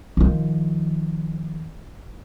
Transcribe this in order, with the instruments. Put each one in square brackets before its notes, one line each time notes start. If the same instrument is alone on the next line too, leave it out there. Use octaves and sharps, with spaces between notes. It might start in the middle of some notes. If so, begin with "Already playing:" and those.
[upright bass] D#3 F3